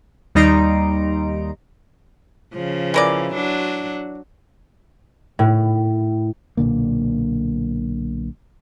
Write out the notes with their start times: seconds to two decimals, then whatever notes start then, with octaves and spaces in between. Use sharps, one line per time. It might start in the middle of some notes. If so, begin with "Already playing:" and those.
0.35 D#2 G3 D#4 A#5 C6 D7
2.53 C#3 F3
2.94 E3 A#4 D5
3.33 F#3 D4 F#4
5.39 A2
6.57 B1 A#2 D3 A#3